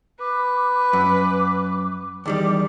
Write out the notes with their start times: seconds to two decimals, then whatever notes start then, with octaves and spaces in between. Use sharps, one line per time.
0.20 B4 D6
0.93 F#2 D6
2.26 E2 D#3 G3 D6